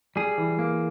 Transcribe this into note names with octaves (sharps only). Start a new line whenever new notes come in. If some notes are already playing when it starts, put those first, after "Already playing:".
G3 G#4
E3
A#3